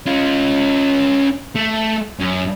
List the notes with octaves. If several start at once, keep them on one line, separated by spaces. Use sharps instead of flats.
C#4 F4
A3
F#2